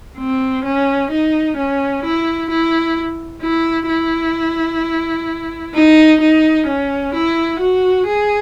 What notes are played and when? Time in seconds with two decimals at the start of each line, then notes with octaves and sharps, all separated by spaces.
0.18 C4
0.65 C#4
1.11 D#4
1.58 C#4
2.04 E4
2.50 E4
3.42 E4
3.89 E4
5.74 D#4
6.21 D#4
6.67 C#4
7.14 E4
7.60 F#4
8.06 G#4